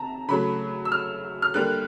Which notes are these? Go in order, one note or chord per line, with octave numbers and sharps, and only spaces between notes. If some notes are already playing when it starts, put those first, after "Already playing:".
Already playing: C3 A5 A#5
C#3 F#3 A3 B5
E6
F6
F6
D3 G3 A#3 F#6